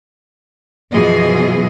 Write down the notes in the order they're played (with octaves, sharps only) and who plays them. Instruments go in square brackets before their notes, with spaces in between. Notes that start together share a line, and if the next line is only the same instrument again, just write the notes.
[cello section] F#2 B2 E3 F3 G#4 D#5